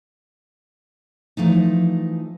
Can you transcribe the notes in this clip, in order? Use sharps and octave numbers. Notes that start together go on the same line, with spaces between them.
E3 F3 A3 D#4